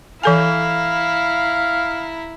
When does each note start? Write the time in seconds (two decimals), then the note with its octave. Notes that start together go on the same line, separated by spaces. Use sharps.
0.23 E3 E4 A4 F5 G#5 A#5